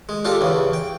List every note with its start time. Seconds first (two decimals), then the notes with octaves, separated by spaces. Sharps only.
0.09 G#3
0.25 D4 F4 G4 A4
0.41 E2 C#3
0.73 G5